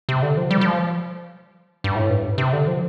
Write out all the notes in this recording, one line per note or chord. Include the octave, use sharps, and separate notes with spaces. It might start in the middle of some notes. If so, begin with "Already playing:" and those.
C3
D3
F3
G3
G3
F3
G2
A2
G2
C3
D3
F3